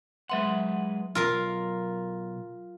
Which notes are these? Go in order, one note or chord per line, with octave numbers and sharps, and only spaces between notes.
F#3 G#3 B4 E5 F#5 C6
B1 F4 A#4 F5